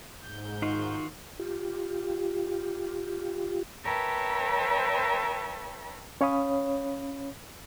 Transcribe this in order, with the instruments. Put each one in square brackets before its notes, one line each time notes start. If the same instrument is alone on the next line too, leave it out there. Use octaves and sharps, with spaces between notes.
[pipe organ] G#2 G6
[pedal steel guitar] D#3 F4 F#4 [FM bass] D#4
[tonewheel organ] F4 G4
[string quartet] A#4 B4 C#5 E5 G5 A5
[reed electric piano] C#4 C#5 F5 B5 D#6